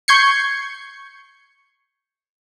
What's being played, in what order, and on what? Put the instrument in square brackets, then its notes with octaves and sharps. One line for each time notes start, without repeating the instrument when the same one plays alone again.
[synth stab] C#6 G6 G#6 C7 C#7